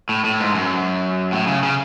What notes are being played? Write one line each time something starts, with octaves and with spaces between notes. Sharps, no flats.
A2
A2
G#2
F#2
A2
C#3
C#3